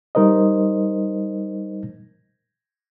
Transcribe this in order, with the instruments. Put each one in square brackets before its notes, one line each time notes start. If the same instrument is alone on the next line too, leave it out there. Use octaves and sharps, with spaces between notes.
[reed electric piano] G3 D#4 A#4 C5 D#5